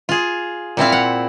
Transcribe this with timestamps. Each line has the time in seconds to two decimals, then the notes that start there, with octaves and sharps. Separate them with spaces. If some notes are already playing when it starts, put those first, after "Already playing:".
0.09 F4 G#4
0.77 A#2 C4 E4 F5
0.92 F#5